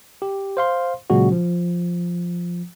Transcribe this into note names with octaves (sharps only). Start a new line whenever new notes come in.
G4
C5 F5 C6
A#2 C#3 F#3 G#3 C#4 F#4
F3